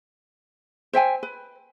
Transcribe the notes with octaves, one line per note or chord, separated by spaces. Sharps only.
C5 E5 G5 G#5
B4